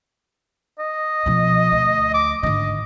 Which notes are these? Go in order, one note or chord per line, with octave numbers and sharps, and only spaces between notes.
D#5
B2 F3
D2
D6
G#1 D3 D#5